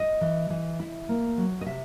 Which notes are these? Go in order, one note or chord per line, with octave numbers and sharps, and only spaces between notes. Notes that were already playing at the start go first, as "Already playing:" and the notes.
Already playing: D#5
E3
E3
E4
A#3
F#3
D#5
C3 E5